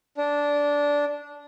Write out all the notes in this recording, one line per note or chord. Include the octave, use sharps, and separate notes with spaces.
D4